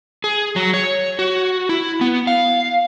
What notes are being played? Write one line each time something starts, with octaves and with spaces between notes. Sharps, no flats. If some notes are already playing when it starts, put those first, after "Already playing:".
G#4
F#3
C#5
F#4
E4
B3
F5